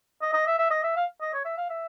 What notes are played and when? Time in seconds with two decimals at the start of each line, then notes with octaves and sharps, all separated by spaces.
0.22 D#5
0.33 D#5
0.47 E5
0.59 E5
0.71 D#5
0.84 E5
0.96 F5
1.21 D#5
1.34 C#5
1.45 E5
1.58 F5
1.70 E5